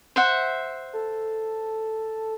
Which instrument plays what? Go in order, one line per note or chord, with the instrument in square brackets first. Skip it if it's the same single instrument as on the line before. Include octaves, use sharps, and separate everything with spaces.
[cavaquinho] C5 E5 F#5
[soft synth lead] A4